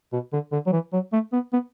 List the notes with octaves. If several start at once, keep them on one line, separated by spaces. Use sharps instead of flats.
B2
D3
D3
F#3
E3
F#3
A3
B3
B3